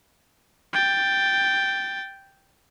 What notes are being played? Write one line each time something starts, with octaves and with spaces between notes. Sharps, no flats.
G5 A6